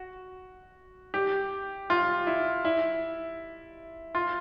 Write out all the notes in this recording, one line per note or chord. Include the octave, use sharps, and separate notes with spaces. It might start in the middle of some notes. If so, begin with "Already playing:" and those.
Already playing: F#4
G4
F4
E4
E4
F4